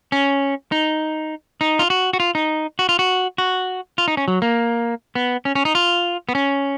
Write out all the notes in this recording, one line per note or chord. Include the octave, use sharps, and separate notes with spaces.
C#4
D#4
D#4
F4
F#4
F#4
F4
D#4
F#4
F4
F#4
F#4
F4
D#4
C#4
F#3
A#3
B3
C#4
C#4
D#4
F4
B3
C#4